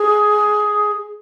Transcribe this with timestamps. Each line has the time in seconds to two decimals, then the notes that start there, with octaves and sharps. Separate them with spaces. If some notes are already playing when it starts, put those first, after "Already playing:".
Already playing: G#4